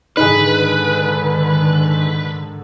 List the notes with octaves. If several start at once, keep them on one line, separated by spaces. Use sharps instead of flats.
G#2 D3 D#3 D#4 G#4 B4